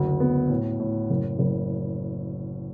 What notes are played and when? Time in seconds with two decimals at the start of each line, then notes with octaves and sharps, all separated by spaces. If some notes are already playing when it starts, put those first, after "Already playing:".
Already playing: F#1 D2
0.20 B3
0.49 A2
0.80 A2
1.10 F#1
1.39 F#1